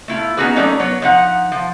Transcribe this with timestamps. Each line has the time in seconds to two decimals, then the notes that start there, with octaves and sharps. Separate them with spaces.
0.08 A3 E4 F4
0.37 B3 C#4 D#4 F#4 G#4 B4
0.55 F#3 A3 C#4 D#4 A#4 D5
0.79 F#3 B3 C#5
1.02 F3 D#4 F#5
1.52 F3